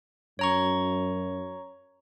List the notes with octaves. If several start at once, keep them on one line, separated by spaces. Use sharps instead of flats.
F#2 C#5 A#5 C#6